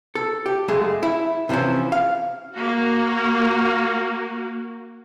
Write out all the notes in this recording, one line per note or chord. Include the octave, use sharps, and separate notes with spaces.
A4
G4
C#2 F#2 G#3 A3 G#4
E4
C3 E3 F3 C4 C#4
F5
A#3 F#4